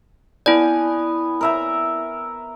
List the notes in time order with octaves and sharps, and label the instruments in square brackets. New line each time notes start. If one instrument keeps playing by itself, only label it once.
[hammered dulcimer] B3 G#5 [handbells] E4 D5
[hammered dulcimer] A#4 E5 A#5